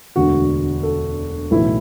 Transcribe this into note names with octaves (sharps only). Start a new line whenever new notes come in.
E1 D2 D3 F#4
A4
B1 A2 E3 E4